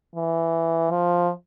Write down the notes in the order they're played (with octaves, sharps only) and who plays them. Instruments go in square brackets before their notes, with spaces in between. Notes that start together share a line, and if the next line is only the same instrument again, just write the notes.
[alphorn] E3
F3